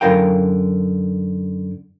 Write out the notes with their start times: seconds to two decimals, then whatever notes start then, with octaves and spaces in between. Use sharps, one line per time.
0.01 F#2 D3 E4 A#4 F5 G5